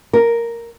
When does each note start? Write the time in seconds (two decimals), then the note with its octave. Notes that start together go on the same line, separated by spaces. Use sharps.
0.13 A#4